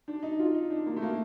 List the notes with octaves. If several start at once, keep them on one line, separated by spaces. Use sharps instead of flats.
D4
D#4
F4
D#4
D4
A#3
A3
A#3